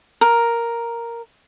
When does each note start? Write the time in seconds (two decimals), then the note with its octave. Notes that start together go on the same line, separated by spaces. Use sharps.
0.21 A#4